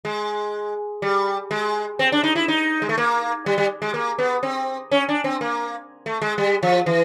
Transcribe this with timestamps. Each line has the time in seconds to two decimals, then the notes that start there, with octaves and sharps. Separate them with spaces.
0.05 G#3
1.02 G3
1.51 G#3
1.99 C4
2.12 D4
2.23 D#4
2.35 E4
2.48 D#4
2.82 G#3
2.89 A3
2.98 A#3
3.46 G3
3.58 G3
3.82 G#3
3.94 A#3
4.18 B3
4.43 C4
4.91 C#4
5.09 D4
5.24 C4
5.41 A#3
6.06 A3
6.22 G#3
6.38 G3
6.63 F3
6.86 E3